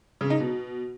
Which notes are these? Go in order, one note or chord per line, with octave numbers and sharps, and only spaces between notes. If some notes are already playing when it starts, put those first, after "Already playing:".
C#3
D#4
B2